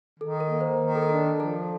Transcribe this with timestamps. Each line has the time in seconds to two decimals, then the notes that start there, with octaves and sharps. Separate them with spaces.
0.20 D#3 A4
0.40 A#4
0.50 A#3
0.61 C5
0.80 D#3
0.95 A4
1.03 A#4
1.09 D4 A4
1.24 A#4
1.40 F3 A4